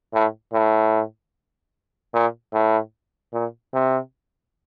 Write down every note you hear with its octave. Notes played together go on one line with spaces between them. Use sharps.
A2
A2
A#2
A2
A#2
C3